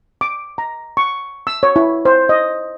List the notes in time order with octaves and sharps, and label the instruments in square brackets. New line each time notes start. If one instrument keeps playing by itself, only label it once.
[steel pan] D6
A#5
C#6
E6
C#5
E4
C5
D#5